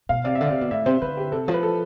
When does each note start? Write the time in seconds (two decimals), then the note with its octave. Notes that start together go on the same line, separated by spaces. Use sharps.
0.09 B2 F5
0.24 C3 D5
0.35 E5
0.41 D3
0.46 C3 D5
0.61 B2
0.71 A2 E5
0.86 C3 C5
1.02 D3 B4
1.17 G4
1.32 C3 A4
1.48 F3
1.54 B4
1.63 A4